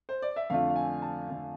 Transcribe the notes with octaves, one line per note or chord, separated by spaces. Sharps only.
C5
D5
E5
F2 D3 A3 D4 F4 F5
F5
G#5
A5
F2 D3 A3 D4 F4